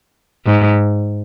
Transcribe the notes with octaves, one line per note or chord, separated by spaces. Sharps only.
G#2